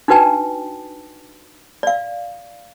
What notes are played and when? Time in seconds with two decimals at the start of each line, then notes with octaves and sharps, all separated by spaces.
0.08 D4 D#4 F#4 B4 G5 A5
1.83 D5 F5